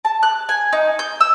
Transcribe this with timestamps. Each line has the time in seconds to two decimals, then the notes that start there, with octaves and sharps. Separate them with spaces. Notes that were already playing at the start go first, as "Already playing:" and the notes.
0.05 A5
0.23 F#6
0.49 G#5
0.73 D#4
0.99 G6
1.21 E6